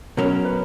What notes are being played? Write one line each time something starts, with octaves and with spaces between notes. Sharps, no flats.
B2 F#3 C#4 A#4
B4